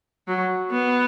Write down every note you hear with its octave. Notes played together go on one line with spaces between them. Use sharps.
F#3
B3